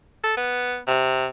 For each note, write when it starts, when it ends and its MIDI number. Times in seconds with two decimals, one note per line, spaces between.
0.24 0.34 69
0.37 0.78 59
0.87 1.27 48